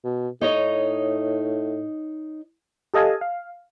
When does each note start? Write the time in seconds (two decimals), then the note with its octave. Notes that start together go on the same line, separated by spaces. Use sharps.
0.05 B2
0.41 A2 D#4 C#5 D#5
2.94 G4 A4 D#5 F5 G#5 A5
3.21 F5